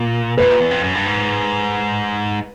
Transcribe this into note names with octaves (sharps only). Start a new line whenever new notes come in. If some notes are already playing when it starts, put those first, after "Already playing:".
Already playing: A#2
A#2 B4
E2
F2
F#2
G2
G#2